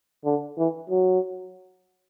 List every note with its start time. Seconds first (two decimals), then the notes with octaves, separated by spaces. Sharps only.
0.24 D3
0.58 E3
0.90 F#3